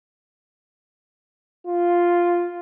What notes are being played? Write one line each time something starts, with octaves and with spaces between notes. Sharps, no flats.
F4